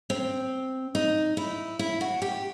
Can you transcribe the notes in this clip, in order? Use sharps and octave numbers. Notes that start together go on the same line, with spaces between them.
C4
D#4
E4
E4
F#4
G4